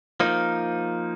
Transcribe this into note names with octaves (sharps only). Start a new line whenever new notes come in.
F3 A#3 D#4